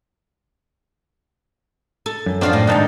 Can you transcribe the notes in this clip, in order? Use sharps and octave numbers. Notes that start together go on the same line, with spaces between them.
A4
F#2
F3 C4 D4 F4 F#4 F5
A2
G#2 C3 D#3 D4 D#4 A4 G5 A5